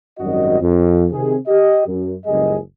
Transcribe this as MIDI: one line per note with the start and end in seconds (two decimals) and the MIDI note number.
0.19 0.58 32
0.19 0.58 42
0.19 0.58 55
0.19 0.58 66
0.19 0.58 75
0.61 1.06 41
1.12 1.36 48
1.12 1.36 51
1.12 1.36 68
1.47 1.85 67
1.47 1.85 75
1.87 2.14 42
2.26 2.58 30
2.26 2.58 37
2.26 2.58 42
2.26 2.58 55
2.26 2.58 68
2.26 2.58 75